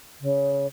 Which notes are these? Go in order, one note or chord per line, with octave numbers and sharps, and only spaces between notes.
C#3